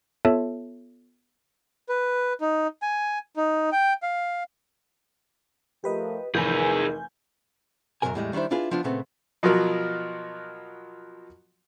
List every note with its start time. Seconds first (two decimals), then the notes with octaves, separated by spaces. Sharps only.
0.25 B3 F4 A4 C#5 E5 A5
1.89 B4
2.41 D#4
2.82 G#5
3.37 D#4
3.72 G5
4.03 F5
5.84 F3 A3 G4 A#4 B4 D#5
6.35 F1 E3 D#4 G#4 A#4 B4 G#5 G6
8.02 B1 F#2 A#2 F#3 A#4 G#5
8.14 E2 A2 G3 G#3
8.33 D#3 G3 D4 E4 C5
8.51 D4 E4 F4 G#4 B4
8.71 F3 B3 D4 F4
8.84 A#2 C#3 A3 B3 C4
9.43 B2 F3 F#3 F#4 A#4